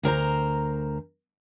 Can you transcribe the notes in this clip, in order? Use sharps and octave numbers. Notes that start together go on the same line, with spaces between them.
D2 A#4 C5 A#5